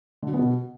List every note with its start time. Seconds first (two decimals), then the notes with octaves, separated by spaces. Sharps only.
0.23 D3
0.28 F#3
0.33 B3
0.39 B2